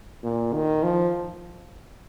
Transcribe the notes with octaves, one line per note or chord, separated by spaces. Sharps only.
A#2
D#3
F3